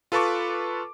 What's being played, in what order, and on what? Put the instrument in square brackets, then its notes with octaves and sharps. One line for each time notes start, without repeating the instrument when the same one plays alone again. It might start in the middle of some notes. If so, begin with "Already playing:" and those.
[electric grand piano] F4 A4 B4 A5 C#6 D6